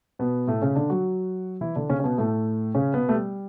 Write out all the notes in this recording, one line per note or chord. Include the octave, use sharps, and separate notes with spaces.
B2 B3
A2 A3
C#3 C#4
D3 D4
F#3 F#4
E3 E4
D3 D4
C#3 C#4
C#4
B2 B3
A2 A3
C#3 C#4
B2 B3
A3
G3